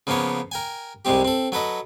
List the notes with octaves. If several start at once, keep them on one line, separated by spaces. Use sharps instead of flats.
C#3 F3 A#3 B3 C#5
A#4 G5 G#5
C2 C3 G#3 C4 G4
C4 A4
F#3 A4 B4 D#5